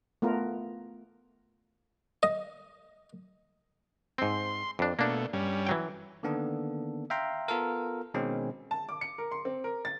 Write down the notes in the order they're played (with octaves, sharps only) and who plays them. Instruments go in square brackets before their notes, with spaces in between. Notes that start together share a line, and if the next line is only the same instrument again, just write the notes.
[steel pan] A3 B3 F4 A#4
[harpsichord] D#5
[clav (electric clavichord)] G#2 C4 [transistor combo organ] C6
[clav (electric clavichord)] F2 D4
[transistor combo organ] B2 A3 [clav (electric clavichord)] A#3 D4
[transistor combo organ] G2 G3 C#4
[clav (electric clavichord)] E3 F#3 G5
[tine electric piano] D3 D#3 A#3 B3 D4 A4
E5 F5 G5 A#5 C6
B3 F4 A4 A#4
B2 D#3 G#3 C4 C#4
[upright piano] A5
D6
C#7
A#4
C6
C4
A#4
A6